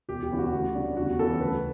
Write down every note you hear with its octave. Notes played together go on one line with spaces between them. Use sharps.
E1 G4
G4
E2 C#3 E3
F#4
D2
C#3 G3 D4
E2 F#4
C#3 E3 B3 A4
D2 B4